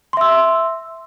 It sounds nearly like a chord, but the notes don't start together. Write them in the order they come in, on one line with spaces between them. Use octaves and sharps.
C6 E5 E6